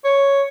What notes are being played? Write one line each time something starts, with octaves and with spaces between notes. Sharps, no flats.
C#5